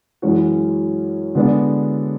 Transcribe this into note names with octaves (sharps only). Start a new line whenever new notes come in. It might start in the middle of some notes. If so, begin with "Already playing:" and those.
F#2 E3 G#3 C#4 F#4
D3 G#3 B3 D4